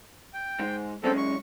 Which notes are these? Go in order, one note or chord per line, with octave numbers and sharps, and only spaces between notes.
G5
G#2 G#3
F#2 G#3 C4 C#4 A4
C#6